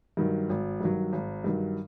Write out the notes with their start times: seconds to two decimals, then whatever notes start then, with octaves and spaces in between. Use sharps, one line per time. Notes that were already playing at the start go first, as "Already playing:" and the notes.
0.17 G2 D#3 F#3
0.49 G#1
0.81 G2 D#3 F#3
1.13 G#1
1.44 G2 D#3 F#3